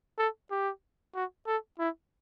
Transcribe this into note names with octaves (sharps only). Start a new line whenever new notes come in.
A4
G4
F#4
A4
E4